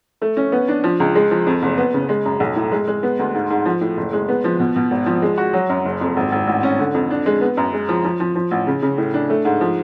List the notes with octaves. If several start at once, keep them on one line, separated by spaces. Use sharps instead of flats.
A3
C#4
B3
D4
F3
C#2
G#3
F3
F2
F#1
B3
C#3
G#3
F#2
B1
A2
G#3
G#3
B3
D2
G#2
G#2
F3
A2
F#1
G#3
B3
F3
B2
B2
G#1
F3
G#3
F#4
F#3
F#2
F#1
F2
G#1
G#1
A1
C#4
D3
F2
D4
G#3
B3
F#2
G#3
F3
F3
F3
F3
A1
C#3
C#3
A2
D4
A3
G#2
F3